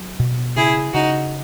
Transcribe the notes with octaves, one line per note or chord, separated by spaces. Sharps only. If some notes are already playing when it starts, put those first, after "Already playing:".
Already playing: F#3
B2
C#3 E4 G#4
C#3 D#4 F#4